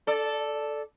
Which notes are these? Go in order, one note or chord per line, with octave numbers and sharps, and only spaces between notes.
A4 D5